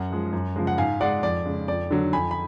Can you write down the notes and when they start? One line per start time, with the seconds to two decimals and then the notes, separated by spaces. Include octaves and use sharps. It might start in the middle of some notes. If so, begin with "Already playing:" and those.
Already playing: F#2 F#5
0.11 F3 G#3
0.33 F#2
0.56 C#3 F3 G#3
0.67 F#5
0.78 G#2 F5 G#5
1.00 G#3 D5 F#5
1.23 F2 D5
1.45 C#3 G#3
1.68 F2 D5
1.91 D3 F#3
2.13 F2 G#5 B5
2.31 B5